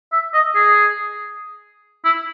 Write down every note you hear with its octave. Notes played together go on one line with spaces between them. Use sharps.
E5
D#5
G#4
E4